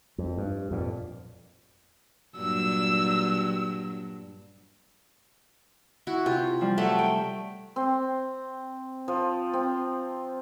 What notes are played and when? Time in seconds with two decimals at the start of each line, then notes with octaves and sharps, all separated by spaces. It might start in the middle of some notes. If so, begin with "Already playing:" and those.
0.18 F2
0.38 G2
0.71 F2 A#2
2.37 G2 A#2 F#3 E6
6.07 E4 F#4
6.26 C3 F4
6.61 F3 G3
6.77 F#3 A3 F#4 E5
6.99 G5
7.76 C4
9.08 F3
9.53 C4